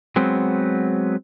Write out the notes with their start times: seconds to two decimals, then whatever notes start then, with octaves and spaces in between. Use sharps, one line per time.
0.16 F#3 G#3 B3 C4